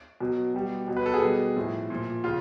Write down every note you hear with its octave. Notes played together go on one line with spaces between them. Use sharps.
B2 F#3
B2 G3
B2 F#3
B4
A4
G#4
B2 G3
A2 F3
A#2 F3
C#3 F4